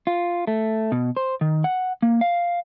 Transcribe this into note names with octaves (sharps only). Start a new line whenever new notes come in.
F4
A3
B2
C5
D#3
F#5
A#3
F5